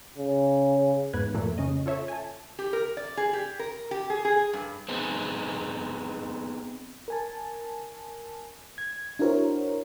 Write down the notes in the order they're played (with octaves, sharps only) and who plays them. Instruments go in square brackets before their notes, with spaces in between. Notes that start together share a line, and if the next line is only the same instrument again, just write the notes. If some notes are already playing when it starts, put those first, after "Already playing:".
[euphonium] C#3
[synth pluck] E2 G#2 B4 F#6 G#6
F2 A#2 A3 A#3
C#3 C#4 D#5
F4 A4 C#5 E5
G#5 A5
[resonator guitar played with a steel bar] G4
A#4
D5
G#4
G4
A#4
G4
G#4
G#4
G2
[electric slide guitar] B3 C4 D#4 G#4
[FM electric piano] A#4 G#5 A5
G#6
D4 E4 F#4 A#4 C5 C#5